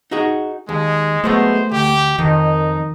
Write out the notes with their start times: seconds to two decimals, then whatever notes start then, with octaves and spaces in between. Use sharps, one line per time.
0.11 D#4 F#4 G#4
0.69 D#2 G#3
1.24 F#3 G#3 A3 B3 C5
1.71 D2 G4
2.18 F2 D#3 D#4